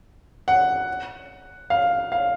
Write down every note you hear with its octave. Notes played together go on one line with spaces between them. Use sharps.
F#5
F5
F5